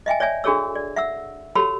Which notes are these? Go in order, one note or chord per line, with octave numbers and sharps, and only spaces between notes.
D#5 E5 G5 G#5
C#5 D5 E5 G#5
D4 F#4 G#4 A4 C#5 E6
D5
E5 F#5 E6
F#4 G4 A4 C#5 B5 E6